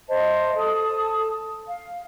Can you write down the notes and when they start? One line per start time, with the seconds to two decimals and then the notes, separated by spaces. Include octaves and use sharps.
0.09 C5 D#5 E5 A5
0.56 A4 A5 D#6
1.68 F5